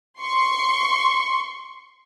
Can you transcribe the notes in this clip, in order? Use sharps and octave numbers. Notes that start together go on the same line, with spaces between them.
C6 C#6